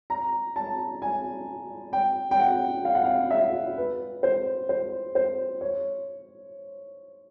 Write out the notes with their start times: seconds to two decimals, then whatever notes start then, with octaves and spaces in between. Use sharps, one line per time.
0.10 A#5
0.56 A5
1.02 G#5
1.93 G5
2.31 G5
2.40 F#5
2.85 F5
2.95 F#5
3.04 F5
3.31 E5
3.77 B4
4.23 C5
4.69 C5
5.15 C5
5.61 C#5